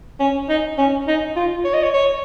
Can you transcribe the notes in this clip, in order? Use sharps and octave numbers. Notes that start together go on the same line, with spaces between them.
C#4
D#4
C#4
D#4
F4
C#5
D#5
C#5
C#5